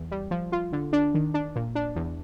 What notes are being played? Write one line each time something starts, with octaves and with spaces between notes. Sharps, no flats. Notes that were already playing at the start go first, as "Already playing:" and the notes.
Already playing: E2
G3
F3
F4
D3
D4
D#3
D4
A#2
D4
E2